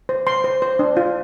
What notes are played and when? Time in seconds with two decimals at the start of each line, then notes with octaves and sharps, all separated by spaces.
0.09 C5
0.27 C5 C6
0.44 C5
0.62 C5
0.79 D4
0.97 F4